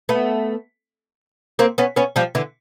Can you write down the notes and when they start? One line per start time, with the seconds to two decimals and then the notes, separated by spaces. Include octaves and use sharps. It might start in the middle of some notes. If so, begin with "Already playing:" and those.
0.09 A3 B3
1.59 A#3 C4
1.78 B3 C#4
1.96 B3 C#4
2.16 F3 G3
2.35 D3 E3